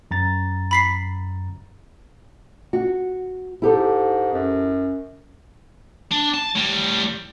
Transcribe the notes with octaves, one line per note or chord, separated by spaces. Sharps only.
F#2 A#5 A6
B5 B6 C7
F#4
G#2 E4 G4 A4
F#2
D4
A5
A2 G3